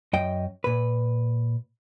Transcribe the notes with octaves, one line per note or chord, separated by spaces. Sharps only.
F#2 D#5 G5
A#2 B4